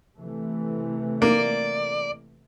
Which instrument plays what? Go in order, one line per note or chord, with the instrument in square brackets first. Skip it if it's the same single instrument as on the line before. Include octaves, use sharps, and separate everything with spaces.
[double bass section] C3 E3 A3
[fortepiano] A#3 [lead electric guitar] D5